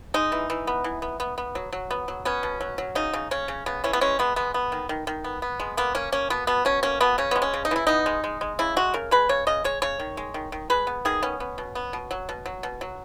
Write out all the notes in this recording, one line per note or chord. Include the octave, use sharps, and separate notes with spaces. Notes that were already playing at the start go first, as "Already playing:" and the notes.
G#3 D#4
E3
E3
B3
E3
B3
B3
B3
F#3
F#3
B3
F#3
B3 C#4
B2
F#3
F#3
C#3 D#4
C#3
C#3 C#4
C#3
C#3 B3
E3 C#4
B3
G#3 C#4
G#3 B3
G#3 B3
B3
D#3
D#3
D#3
B3
B3
G#3
A#3 B3
A#3 C#4
A#3 C#4
B2 B3
B2 B3
B2 C#4
A#3 C#4
B2 B3
C#3 C#4
G#3 B3
C#4
C#3
D#4
E3 E4
B3 D#4
G#3
G#3
G#3
C#3 E4
G#3 F#4
C#3 A#4
G#3 B4
C#3 C#5
C#3 D#5
G#3 C#5
C#3 C#5
D#3
G#3
D#3
D#3
G#3 B4
B3
D#3 G#4
B3 C#4
B3
B2
B3
B2
F#3
B2
F#3
B2
F#3